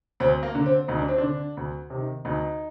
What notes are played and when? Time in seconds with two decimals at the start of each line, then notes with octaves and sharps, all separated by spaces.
0.20 D2 C4
0.43 A#3
0.55 D3
0.66 C4
0.88 D2 D#4
0.99 D4
1.08 C4
1.18 D3 D4
1.57 D2
1.90 C3 D#3
2.25 D2 D#4